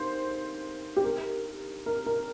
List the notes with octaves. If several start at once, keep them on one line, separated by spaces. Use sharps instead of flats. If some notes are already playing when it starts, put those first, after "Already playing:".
Already playing: D#4 G4 A#4 C5 F5
G4
A#4
A#4
A#4